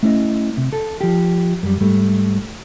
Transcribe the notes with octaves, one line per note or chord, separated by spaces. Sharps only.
A3 C#4 E4 D5 D#5
C3
A4
F3 G4
F#2 G3
G#2 G3 A3